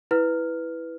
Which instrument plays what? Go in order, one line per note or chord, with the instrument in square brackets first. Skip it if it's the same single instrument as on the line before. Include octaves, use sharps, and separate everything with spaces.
[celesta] E4 B4 F6